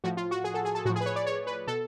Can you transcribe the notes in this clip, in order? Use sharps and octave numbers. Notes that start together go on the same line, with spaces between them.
A2 F3 F#4
F4
F#4
G#4
A4
G#4
A4
A2 F3 F#4
G#4
B4
C#5
D5
C#5
B4
B2 A4